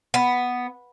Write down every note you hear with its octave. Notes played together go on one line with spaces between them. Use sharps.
B3